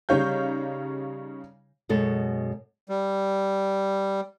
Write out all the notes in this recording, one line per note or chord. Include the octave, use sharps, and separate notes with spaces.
C#3 G3 D#4 C#5 F5 G6
F#2 B2 G#3 A4
G3